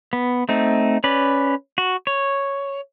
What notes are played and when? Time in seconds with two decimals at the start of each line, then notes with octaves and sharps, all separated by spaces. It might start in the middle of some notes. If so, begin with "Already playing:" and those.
0.13 B3
0.49 A3 C4 D#4
1.04 C#4 B4 D5
1.78 F#4
2.07 C#5